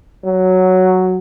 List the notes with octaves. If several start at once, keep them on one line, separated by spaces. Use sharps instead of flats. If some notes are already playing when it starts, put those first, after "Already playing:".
F#3